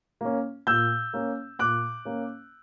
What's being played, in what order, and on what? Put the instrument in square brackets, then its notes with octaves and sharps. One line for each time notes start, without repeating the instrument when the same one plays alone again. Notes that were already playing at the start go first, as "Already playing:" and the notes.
[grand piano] A#3 C#4
A#2 E6 G6
A#3 C#4
A#2 D6 F#6
A#3 C#4